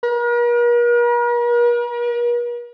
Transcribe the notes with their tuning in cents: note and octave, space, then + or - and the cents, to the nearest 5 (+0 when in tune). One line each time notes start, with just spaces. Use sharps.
A#4 +45